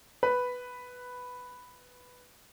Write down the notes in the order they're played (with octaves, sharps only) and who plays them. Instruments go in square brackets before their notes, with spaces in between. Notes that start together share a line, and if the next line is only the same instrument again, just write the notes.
[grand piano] B4 B5